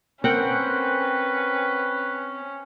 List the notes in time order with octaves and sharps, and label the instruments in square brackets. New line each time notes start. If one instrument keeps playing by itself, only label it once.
[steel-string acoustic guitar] C4 [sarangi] C#4 [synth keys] A#4 F#5 G5 [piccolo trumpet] B4